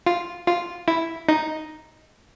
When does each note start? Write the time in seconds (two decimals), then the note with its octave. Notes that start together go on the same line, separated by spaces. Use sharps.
0.07 F4
0.47 F4
0.88 E4
1.29 D#4